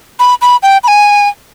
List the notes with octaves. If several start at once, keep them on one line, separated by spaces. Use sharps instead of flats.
B5
B5
G5
B5
G#5